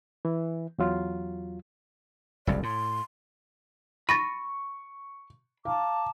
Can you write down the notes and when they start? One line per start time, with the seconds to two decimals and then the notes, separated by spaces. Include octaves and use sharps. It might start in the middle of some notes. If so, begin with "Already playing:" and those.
0.25 E3
0.78 E2 F#3 F4
2.47 F#1 C2 F2 D5
2.63 A2 C6
4.09 B5 C#6 A6 A#6 D#7
5.65 F5 A5 A#5 D6